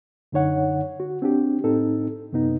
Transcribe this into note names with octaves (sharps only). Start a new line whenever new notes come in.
F#2 D3 D#4 C#5 F#5
F#4
C4 D4 G4
A2 C4 D#4 A4
F#2 C3 B3 D#4